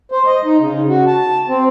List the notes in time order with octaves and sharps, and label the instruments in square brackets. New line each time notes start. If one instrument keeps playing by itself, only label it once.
[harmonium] C5
D#5
D#4
C#3
F#4
A5
C4